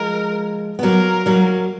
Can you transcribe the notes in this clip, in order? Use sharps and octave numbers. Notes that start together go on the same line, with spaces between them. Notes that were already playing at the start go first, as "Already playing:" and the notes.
Already playing: F3 G#3 A#4
B3
F#3 A#3 A#4
F#3 A#3